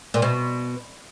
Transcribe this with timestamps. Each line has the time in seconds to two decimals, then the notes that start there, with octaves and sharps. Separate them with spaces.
0.14 A#2
0.22 B2